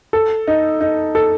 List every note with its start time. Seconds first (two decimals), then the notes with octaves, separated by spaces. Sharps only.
0.13 A4
0.47 D#4
0.81 D#4
1.15 A4